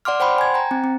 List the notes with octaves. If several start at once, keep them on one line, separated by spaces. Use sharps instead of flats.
D5 F#5 C6 D6 F6
C5 F#5 G5 B5 C6
G#5 G#6
G5 A#5
C4
C4